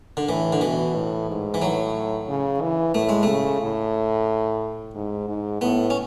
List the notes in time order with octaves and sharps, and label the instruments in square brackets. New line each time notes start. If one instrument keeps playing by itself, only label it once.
[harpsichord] D3
[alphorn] A2 [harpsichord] E3
[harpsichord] D3
[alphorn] B2 [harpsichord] E3
[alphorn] A2
G#2
[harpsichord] E3
[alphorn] A2 [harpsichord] F#3
[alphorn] C#3
E3
[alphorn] A2 [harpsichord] A3
[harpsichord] G#3
A3
[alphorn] C#3
A2
G#2
G#2
[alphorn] A2 [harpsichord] B3
[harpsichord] C#4